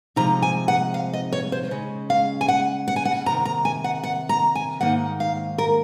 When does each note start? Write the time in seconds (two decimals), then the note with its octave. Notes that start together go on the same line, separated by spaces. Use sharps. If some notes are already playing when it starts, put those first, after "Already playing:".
0.16 C3 F3 G#3 D#4 A#5
0.42 G#5
0.68 F#5
0.94 F5
1.13 D#5
1.32 C#5
1.52 C5
1.71 C#3 G#3 C#4
2.10 F5
2.41 G#5
2.48 F#5
2.88 F#5
2.96 G#5
3.05 F#5
3.26 F2 C3 D#3 A#5
3.45 A#5
3.65 G#5
3.84 F#5
4.03 F#5
4.29 A#5
4.55 G#5
4.81 G#2 D#3 A#3 D#4 F#5
5.20 F5
5.58 A#4